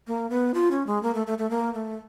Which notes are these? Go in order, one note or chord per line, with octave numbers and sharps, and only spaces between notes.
A#3
B3
F4
C#4
G#3
A#3
A3
A3
A3
A#3
A3